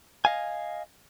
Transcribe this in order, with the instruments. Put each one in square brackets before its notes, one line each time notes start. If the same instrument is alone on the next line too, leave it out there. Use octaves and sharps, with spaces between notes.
[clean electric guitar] D#5 F5 G#5